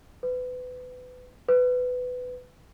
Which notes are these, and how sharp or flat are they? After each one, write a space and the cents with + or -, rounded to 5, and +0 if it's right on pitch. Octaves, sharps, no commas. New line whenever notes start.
B4 +25
B4 +15